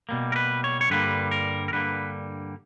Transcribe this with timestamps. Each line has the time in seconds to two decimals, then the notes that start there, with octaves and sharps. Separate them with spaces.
0.09 B2 G3 A#3
0.32 A#4
0.36 B4
0.64 C#5
0.81 C#5
0.90 G2 D3 G3 A#3 B4
1.31 A#4
1.68 A#4
1.72 G2 D3 G3 A#3 B4